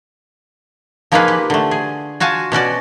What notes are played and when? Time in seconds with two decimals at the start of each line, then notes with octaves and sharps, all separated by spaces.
1.12 F3 A#3 D#4 F4 G#4 B4
1.28 G4
1.50 D3 A3
1.71 G#4
2.20 F4 F#4 G#5 A5
2.52 B2 C#4 F#4 D5